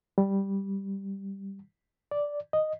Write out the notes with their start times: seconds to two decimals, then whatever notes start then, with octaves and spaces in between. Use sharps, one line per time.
0.18 G3
2.11 D5
2.53 D#5